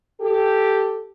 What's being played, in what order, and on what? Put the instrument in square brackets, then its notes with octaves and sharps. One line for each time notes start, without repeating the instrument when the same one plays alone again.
[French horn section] G4 A4